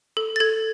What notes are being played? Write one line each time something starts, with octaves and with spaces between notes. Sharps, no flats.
A4
A6
A4 G#6